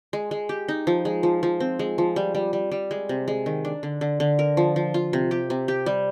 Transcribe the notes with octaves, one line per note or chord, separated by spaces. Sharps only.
G#3
G#3
G4
D#4
F3
G#3
F3
F3
C4
G#3
F3
G3
G3
G3
G3
G#3
C3
G#3
D#3
D4
D3
D3
D3
A#4
F3
F3
F4
C3
G4
C3
G4
G3